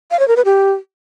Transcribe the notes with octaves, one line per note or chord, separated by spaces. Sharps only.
F5
C#5
A#4
B4
G4